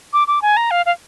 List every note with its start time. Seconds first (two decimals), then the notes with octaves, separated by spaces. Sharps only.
0.13 D6
0.28 D6
0.42 G#5
0.57 A#5
0.71 F5
0.86 F5